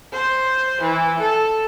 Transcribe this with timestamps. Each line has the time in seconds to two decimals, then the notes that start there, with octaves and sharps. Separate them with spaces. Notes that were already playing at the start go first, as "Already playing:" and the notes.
0.13 C5
0.81 E3
1.20 A4